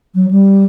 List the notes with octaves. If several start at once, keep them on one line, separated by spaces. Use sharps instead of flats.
F#3
G3